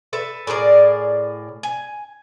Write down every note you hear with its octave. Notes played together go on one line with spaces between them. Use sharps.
A4 B4 E5
A2 G#4 A#4 D5
G#5